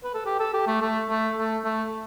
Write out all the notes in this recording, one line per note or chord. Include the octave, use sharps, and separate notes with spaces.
B4
A4
G4
A4
G4
A3
A3
A3
A3
A3